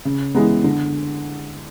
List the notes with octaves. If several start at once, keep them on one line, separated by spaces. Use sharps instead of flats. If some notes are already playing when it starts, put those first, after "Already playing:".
C#3
E3 G#3 B3
D3